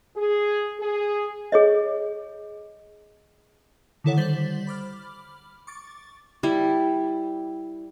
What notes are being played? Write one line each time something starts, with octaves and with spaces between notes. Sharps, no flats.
G#4
G#4
G#4 C#5 D#5
D3 D#3 E4 A4 C#5 F#5
G3 C5 A6 B6 F#7
B5 D6 F6
C#6 D6 A6
G3 E4